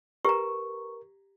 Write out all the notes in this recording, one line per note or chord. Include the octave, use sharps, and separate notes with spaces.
G4 A#4 B4 A#5 C#6